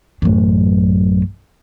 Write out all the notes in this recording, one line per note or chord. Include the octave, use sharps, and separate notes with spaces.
A1 F#2